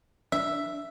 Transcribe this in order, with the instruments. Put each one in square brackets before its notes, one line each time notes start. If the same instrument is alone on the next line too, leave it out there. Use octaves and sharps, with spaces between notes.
[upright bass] D4 [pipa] E5